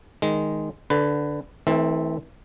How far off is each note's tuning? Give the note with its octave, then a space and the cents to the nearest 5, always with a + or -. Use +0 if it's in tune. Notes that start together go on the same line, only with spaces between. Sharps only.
D#3 +0 G#3 +0
D3 +0 B4 +20
E3 -40 A3 +0 C4 +0